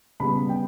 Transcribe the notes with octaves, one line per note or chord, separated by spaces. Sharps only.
C#3 G3 B3 B5
G5